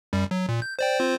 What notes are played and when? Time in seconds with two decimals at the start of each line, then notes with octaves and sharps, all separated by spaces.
0.13 F#2 G3
0.31 F#3
0.49 A#2
0.62 G6
0.79 C5 D5 G5
1.00 C4 F4 C5